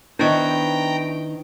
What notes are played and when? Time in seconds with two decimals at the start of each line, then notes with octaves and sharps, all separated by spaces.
0.19 D#3 B3 D4 E4 C5 G5 A#5 C#6